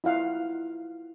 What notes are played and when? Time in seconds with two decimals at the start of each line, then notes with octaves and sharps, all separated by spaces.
0.04 E4 F4 F5 F#5